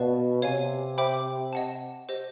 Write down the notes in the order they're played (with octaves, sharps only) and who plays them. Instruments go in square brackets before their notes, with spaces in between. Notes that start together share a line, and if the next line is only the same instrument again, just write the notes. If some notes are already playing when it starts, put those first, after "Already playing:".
Already playing: [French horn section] B2 [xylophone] B4 D5 F5 A5
[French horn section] C3 [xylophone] C#5 F5 G#5
[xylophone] C5 E5 G5 B5 D6
D#5 F#5 A5
G4 C5 D#5